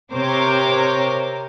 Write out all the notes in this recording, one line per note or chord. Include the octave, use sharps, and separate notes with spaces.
C3 A#4 C5 C#5 D6